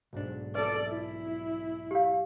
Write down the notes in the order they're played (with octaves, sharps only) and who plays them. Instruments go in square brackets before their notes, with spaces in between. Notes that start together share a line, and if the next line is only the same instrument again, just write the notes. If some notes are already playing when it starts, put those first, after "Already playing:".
[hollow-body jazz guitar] B1 G#2 D4
[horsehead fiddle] A4 D5 [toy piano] B4
[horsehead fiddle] E4
[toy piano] G4 F5